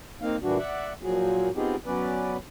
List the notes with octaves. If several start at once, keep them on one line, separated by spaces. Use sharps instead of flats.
A#3 C4 D#4 F5
A#2 E3 G3 D4 F#4
D5 E5 F#5
A#2 F3 F#3 F#4 G#4
B3 C4 D#4 F4 G4 G#4
F#3 B3 C#4 B4 D5